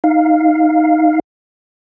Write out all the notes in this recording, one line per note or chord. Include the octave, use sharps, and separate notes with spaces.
D#4 F5